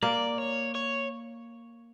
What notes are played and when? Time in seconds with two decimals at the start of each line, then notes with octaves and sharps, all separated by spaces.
0.02 A#3 D5
0.38 C#5
0.75 C#5